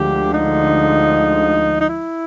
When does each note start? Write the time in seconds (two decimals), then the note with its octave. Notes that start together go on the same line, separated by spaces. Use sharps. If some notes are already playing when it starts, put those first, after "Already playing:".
Already playing: D2 D3 F3 G#3 G4
0.32 D#4
1.80 D#4
1.89 E4